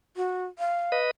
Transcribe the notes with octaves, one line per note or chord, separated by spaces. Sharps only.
F#4
F5
B4 D#5